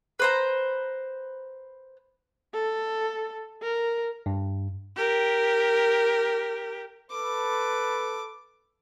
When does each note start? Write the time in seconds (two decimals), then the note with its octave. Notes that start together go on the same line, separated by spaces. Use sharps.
0.19 B4 C5 A#5
2.53 A4
3.62 A#4
4.26 G2
4.96 G4 A#4
7.11 A4 B4 D6